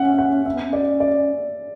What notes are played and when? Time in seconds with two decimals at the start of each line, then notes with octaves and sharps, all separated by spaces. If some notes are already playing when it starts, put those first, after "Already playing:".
Already playing: C#4 E5 F#5
0.18 F#5
0.46 C#4 E5
0.54 B3
0.63 C#4
0.73 D5
1.00 D5